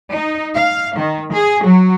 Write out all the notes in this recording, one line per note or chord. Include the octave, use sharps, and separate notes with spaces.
D#4
F5
D#3
G#4
F#3